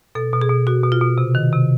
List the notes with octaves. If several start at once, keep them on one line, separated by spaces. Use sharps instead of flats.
B2 A4
B2
G#4
B2
B2 F#4
B2
F4
B2
C3
D#3
C3